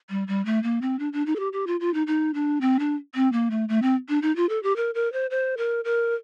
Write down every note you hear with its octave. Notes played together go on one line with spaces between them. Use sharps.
G3
G3
A3
A#3
C4
D4
D4
D#4
A4
G4
G4
F4
F4
D#4
D#4
D4
C4
D4
C4
A#3
A3
A3
C4
D4
D#4
F4
A4
G4
A#4
A#4
C5
C5
A#4
A#4